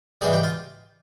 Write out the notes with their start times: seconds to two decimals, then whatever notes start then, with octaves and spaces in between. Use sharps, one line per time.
0.21 G#2 E3 G3 G#4
0.33 G4
0.43 F4